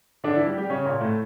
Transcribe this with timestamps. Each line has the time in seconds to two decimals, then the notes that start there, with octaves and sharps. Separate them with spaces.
0.24 D3 D4
0.35 E3 E4
0.47 G3 G4
0.58 G3 G4
0.70 C#3 C#4
0.85 A#2 A#3
1.01 A2 A3